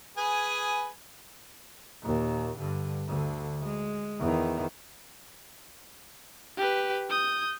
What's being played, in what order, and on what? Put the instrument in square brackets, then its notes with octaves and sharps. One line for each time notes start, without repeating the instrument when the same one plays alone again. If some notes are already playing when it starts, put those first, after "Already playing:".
[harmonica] G#4 B4 G#5
[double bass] D#2 A#2
G2 D3
D2 D3
G#3
E2 D#3
[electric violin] G4 B4
D#6 G6